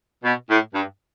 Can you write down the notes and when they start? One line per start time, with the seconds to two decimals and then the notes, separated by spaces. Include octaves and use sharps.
0.24 B2
0.49 A2
0.73 G2